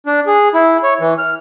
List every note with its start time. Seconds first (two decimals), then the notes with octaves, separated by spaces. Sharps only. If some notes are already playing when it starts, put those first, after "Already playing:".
0.07 D4
0.27 G#4
0.54 E4
0.83 C#5
1.00 E3
1.18 F6